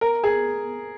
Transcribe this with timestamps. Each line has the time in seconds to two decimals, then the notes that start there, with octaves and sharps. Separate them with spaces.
0.01 A#4
0.24 G#4